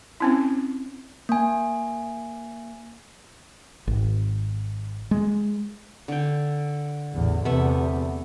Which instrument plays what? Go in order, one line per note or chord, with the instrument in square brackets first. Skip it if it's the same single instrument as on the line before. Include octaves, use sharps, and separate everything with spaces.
[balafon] C4 C#4 E4
[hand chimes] A#3 G#5
[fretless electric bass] G#1
G#3
[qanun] D3 G5
[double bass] A1 E2
[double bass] E2 C3 [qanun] A3 B3 E5